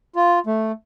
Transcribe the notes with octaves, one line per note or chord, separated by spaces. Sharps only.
F4
A3